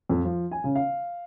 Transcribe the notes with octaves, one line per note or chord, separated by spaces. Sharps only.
F2
F3
G#5
C#3
F5